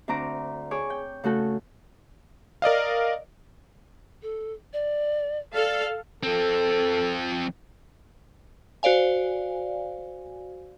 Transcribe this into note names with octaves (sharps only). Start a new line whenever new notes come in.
D2 C4 D4 A#5 D6
G#4 C#5 G#5 D6 E6
G5
C#3 A3 F#4 A4
A#4 D5 D#5 F5
A4
D5
A4 D5 F5
F3 C4 A4
F#4 C5 D5 F5 G#5